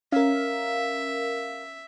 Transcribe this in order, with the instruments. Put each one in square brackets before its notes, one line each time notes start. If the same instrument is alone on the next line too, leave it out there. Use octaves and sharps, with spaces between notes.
[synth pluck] C#4 [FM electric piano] A#4 F5 [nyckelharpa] E5